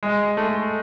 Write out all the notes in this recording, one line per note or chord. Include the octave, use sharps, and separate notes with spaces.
G#3
A3